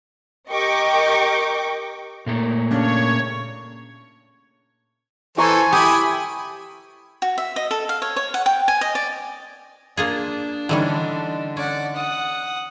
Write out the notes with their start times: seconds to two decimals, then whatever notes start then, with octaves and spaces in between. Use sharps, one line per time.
0.50 G4 A#4 D#5 G5 C#6 D6
2.26 A#2 A3 A#3
2.71 C#3 D4 C#5
5.38 E3 A4 C5 G#5 A#5 C#6
5.72 E4 G4 D#6
7.22 F#4
7.38 E5
7.56 D#5
7.71 A4
7.89 F5
8.02 C#5
8.16 C#5
8.34 F#5
8.46 G5
8.68 G#5
8.81 D#5
8.95 D5
9.97 A#3 D4 F4 G#4
10.69 D3 E3 G3 C#4 D#4
11.57 C#4 D5 F#5
11.96 F#5 D#6